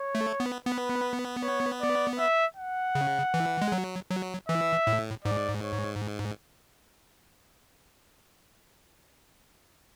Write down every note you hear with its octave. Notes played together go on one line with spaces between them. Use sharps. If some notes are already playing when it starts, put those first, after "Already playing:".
Already playing: C#5
A3
B3
B3 B4
C#5
D5
E5
F#5
C#3
E3
G#3
F#3
F#3
E3 E5
A2
G#2 D5
C#5